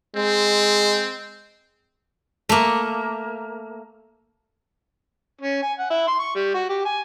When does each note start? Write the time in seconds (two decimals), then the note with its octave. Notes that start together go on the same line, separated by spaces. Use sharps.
0.16 G#3 C4
2.49 A3 A#3
5.41 C#4
5.63 G#5
5.79 F#5
5.90 E4
6.08 C6
6.19 C#6
6.36 G3
6.54 F#4
6.70 G4
6.86 G#5